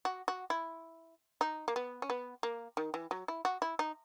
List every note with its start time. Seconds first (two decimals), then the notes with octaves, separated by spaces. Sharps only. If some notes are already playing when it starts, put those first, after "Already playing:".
0.05 F#4
0.28 F#4
0.50 E4
1.41 D#4
1.68 A#3
1.76 B3
2.02 C#4
2.10 B3
2.43 A#3
2.77 D#3
2.94 E3
3.11 F#3
3.28 E4
3.45 F#4
3.62 E4
3.79 D#4